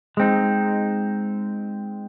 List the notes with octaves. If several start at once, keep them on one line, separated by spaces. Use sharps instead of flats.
G#3 C4 D#4